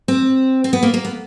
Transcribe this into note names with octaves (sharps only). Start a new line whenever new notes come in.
C4
C4
B3
A#3
A#3
B3